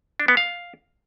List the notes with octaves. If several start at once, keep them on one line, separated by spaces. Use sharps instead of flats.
D4
B3
F5